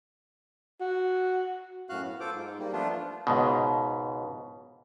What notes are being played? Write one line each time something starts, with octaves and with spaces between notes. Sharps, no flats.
F#4
F#2 A2 F#4 F5 F#6
B3
F4 A4 C5 D6
G#2
G3 A#3
F3 A3 B3 D4 F4
C#2 G#2 B2